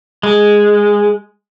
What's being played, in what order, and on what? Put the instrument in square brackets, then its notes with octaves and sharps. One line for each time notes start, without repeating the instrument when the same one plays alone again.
[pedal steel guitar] G#3